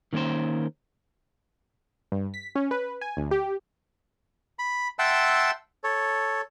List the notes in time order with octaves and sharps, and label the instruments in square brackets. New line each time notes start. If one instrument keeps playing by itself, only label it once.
[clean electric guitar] D#3 A#3 C#4 A#4 C5
[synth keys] G2
B6
C#4
B4
G#5
D2
G4
[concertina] B5
E5 F#5 G5 A5 C6 E6
A4 C#5